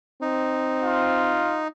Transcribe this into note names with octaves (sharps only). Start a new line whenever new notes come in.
C4 D#4
F4